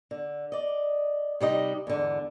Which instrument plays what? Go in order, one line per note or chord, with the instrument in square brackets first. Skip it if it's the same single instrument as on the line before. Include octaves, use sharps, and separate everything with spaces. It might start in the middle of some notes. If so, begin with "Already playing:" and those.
[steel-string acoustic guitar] D3
D5 D#5
C3 G3 D#4 D#5
E2 G#2 D3